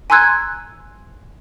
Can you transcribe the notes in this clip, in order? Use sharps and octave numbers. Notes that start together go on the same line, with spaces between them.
G#5 A#5 C6 E6 F#6 G#6